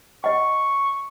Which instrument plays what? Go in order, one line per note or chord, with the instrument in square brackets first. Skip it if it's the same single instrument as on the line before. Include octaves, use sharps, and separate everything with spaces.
[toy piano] D#5 F#5 [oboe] C#6